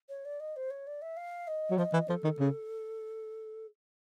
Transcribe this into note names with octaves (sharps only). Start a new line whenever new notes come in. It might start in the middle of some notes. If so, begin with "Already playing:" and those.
C#5
D5
D#5
C5
C#5
D5
E5
F5
D#5
F#3
F3 D#5
E3
F3 A4
D#3
C#3